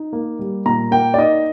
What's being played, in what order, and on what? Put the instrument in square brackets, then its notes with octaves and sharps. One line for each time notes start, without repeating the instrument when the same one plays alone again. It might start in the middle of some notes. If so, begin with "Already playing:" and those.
Already playing: [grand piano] D#4
A#3
G3
A#2 A#5
A#3 G5
D5
D#4 D#5